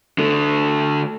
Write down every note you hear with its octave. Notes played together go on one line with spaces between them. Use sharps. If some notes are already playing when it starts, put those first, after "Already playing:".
D3 A3